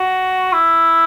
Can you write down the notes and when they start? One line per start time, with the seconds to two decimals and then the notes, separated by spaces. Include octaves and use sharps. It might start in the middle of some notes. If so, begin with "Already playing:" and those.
Already playing: F#4
0.53 E4